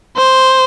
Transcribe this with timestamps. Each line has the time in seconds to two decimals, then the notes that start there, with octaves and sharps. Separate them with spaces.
0.17 C5